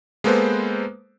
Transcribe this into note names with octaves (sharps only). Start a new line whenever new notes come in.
G#3 A#3 B3 A4 B4 C5